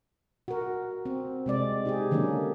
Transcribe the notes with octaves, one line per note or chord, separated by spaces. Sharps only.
F#4 A#4
C4
C3 G#3 D5
D#4 G4 G#4
D3 D#3 F#3 A#3 C#4 D4